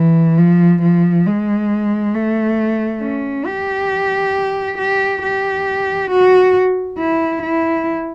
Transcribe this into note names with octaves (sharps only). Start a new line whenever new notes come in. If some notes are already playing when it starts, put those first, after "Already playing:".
Already playing: E3
F3
F3
G#3
A3
C#4
G4
G4
G4
F#4
E4
E4